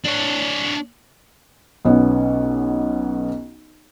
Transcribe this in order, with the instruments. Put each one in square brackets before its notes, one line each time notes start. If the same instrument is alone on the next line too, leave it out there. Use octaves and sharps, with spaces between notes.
[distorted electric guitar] D4 C#5
[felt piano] B1 B3 C#4